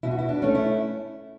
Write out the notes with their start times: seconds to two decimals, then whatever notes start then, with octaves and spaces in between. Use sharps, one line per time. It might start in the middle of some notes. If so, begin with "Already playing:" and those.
0.03 B2 E4
0.11 F#4
0.19 E4
0.29 D4
0.42 A3 C#4
0.55 E4